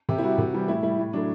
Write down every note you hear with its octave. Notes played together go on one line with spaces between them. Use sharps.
C3 G4
E4
G3 F#4
C3
E3 G3
A2 E4
G3 E4
A2
F#3 A3 D4